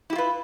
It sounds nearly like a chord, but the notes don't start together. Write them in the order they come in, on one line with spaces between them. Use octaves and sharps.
E4 G4 F4 B4